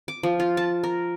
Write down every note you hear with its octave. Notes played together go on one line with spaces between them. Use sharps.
D6
F3
F4
A5
A#4